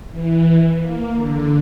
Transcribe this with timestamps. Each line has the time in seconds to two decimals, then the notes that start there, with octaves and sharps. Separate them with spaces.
0.10 E3
0.79 A#3
1.13 D3